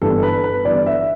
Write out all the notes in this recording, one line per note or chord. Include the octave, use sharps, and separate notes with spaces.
G1 G2 E3 B3 A4
B4
B4
G1 G2 E3 B3 D5
E5